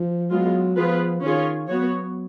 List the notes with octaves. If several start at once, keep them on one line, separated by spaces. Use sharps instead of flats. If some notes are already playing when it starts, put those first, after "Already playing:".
Already playing: F3
F#3 G#3 B3 F4
F3 B3 F4 G#4 B4
D#3 C#4 F4 G#4 C#5
F#3 B3 F#4 C#5